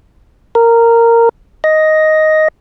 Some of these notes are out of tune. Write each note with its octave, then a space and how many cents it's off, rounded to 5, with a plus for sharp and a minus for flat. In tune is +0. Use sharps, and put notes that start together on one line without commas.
A#4 -10
D#5 +5